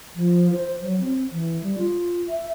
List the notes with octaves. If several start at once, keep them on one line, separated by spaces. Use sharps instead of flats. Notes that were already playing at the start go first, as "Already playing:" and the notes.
F3
C5
F#3
C4
E3
G3
F4
E5